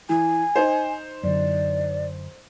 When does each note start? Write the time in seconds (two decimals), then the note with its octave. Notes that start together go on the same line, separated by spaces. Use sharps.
0.09 E3 G#5
0.56 D#4 C5
1.23 F#2 D3 D5